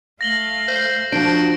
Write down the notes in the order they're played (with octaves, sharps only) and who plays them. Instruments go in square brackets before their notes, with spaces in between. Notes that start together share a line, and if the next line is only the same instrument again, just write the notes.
[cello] A3 F5 [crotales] A#6 F#7 G7
[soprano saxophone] C5
[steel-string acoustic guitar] F3 D4 [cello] F#4 [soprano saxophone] C5 [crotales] D7